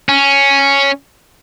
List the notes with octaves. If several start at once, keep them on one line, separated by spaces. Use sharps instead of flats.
C#4